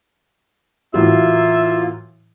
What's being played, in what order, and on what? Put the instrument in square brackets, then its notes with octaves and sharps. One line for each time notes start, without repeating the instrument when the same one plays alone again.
[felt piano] A2 E3 F#3 [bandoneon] A#3 F4 [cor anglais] E5